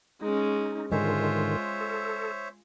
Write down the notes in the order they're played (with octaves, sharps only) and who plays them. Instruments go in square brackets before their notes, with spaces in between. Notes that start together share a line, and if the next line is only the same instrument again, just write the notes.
[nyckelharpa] G#3 C#4 [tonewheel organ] D#4
[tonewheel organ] G#2 D3 D#3 [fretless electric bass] G#3 [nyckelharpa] F4 [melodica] C5 C#5 E5
[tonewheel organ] A4